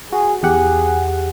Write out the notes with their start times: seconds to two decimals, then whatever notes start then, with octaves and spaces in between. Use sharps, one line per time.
0.12 F#4 G#4
0.43 E2 G4 G#4 F#5